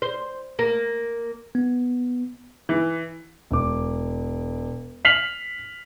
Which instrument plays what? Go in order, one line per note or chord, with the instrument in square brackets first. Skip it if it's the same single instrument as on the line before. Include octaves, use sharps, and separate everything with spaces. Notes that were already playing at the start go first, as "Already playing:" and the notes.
[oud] C5
A#3
[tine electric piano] B3
[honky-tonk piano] E3
[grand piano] E1 D6
F6 B6 C7 F7 F#7